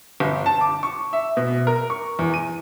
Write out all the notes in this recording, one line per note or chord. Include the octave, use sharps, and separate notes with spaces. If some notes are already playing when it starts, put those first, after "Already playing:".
G1
A5
D6
C#6
E5
B2
A#4
C#6
E2
D#7